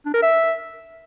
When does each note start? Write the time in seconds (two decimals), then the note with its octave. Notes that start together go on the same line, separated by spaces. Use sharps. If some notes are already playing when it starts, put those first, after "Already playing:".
0.06 D4
0.14 A#4
0.22 E5